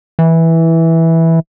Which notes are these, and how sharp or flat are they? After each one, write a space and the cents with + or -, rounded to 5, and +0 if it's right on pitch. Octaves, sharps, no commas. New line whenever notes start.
E3 -10